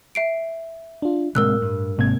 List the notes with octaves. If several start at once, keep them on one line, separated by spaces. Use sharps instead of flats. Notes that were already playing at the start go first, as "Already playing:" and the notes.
E5 C7 D7
D4 F4
A2 C3 G#3 A#3 A#4 E6 F#6
G2
G#2 C3 A#3 C4 G#6